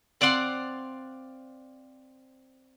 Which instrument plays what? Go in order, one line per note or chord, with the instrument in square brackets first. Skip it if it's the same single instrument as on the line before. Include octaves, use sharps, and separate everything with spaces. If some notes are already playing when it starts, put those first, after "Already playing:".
[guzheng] C4 D5 F5 F#5 C6